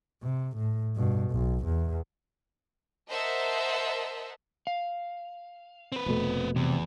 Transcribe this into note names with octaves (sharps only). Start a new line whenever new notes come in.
C3
A2
G2 B2
B1
E2
A#4 C5 D#5 E5 F#5 A5
F5
C4 B4
F1 B2 A3
E2 C3